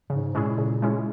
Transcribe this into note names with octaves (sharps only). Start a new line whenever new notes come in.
G#2 C#3
A#2 G#3 C#4 E4 G#4
C#3
G#3 C#4 E4 G#4